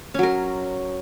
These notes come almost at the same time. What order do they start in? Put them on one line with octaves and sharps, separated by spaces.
C#4 F#3 A#4